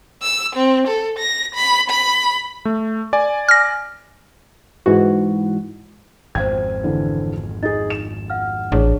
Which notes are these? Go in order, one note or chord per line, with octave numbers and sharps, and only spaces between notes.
E6
C4
A4
A#6
B5
B5
A3
D5 G#5
F6 A#6
G#2 E3 F#4
G#1 F2 C5 F5 G5 G#6
D3 E3
D#4 G#4 A6
E7
F5 F#5 F6
A1 D4 G#4 C#5